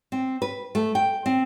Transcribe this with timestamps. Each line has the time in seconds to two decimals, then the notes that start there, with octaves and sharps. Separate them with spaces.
0.12 C4
0.42 B4
0.75 A3
0.95 G5
1.26 C4